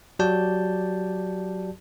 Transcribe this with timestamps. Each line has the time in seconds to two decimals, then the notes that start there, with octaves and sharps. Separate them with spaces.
0.19 F#3 F#4 G4 D5 A5 G6